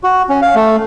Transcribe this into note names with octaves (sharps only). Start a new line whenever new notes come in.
F#4
C#4
F5
A3